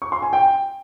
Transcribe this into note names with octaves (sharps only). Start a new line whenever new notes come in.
C#6
C6
G#5
G5